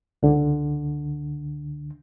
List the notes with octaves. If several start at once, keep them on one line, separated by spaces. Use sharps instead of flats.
C#2 D3